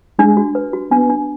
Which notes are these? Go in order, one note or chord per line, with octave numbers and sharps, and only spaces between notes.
G#3 D4
F#4
B4
F#4
B3 D4
D4